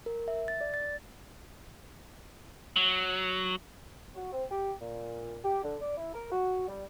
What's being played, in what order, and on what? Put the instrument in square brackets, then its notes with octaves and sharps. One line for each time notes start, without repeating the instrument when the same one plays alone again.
[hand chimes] A#4
E5
A6
D5
A6
[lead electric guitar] F#3
[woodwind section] F#4
C4
G4
A#2
G4
D3
D5
E4
A#4
F#4
G3